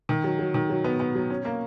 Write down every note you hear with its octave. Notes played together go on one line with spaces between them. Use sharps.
D#3
F#3
F#3
D#3
F#3
B3
B3
F#3
C#4
A#3